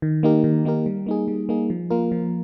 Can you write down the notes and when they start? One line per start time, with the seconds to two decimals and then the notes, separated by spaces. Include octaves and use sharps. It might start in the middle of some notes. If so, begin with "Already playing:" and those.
0.02 D#3
0.23 A#3 D#4 G4 A#4
0.44 D#3
0.65 A#3 D#4 G4 A#4
0.86 G3
1.06 A#3 D#4 G#4
1.28 G3
1.49 A#3 D#4 G#4
1.70 F3
1.90 A#3 F4 A#4
2.12 F3